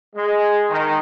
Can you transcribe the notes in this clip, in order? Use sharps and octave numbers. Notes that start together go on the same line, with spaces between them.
G#3
D#3